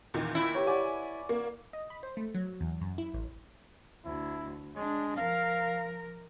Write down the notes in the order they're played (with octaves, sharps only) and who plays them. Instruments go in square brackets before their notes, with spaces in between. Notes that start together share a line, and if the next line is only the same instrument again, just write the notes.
[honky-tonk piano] E2 A#2 D#3
[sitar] E4
[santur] G4 B4 C#5
[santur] B4 D5 F#5 [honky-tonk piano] G#5
[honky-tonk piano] A#3
[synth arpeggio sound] D#5
B5
C5
A3
F#3
E2
F#2
E4
A1
[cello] D2 [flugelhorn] E4
[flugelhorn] G#3 [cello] D4
[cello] F3 A#4 [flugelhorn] F5